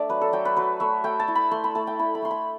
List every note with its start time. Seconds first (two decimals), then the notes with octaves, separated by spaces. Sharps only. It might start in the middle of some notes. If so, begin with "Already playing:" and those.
Already playing: A3 D4 D5 E5
0.09 F#3 B4
0.21 A4
0.33 F#3 G5
0.45 B4
0.57 F#3 B4
0.80 A3 E5
1.04 A3 G5
1.20 A5
1.28 E4
1.35 B5
1.51 A3 C6
1.64 B5
1.75 A3 A5
1.87 G5
1.99 E4 B5
2.15 B5
2.22 A3 C6
2.31 B5